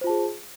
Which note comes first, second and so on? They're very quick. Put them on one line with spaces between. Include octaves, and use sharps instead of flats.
C5 F4 A5 G#4